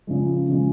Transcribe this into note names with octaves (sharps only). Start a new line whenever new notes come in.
C#3 F3 G#3
C#3 F3 G#3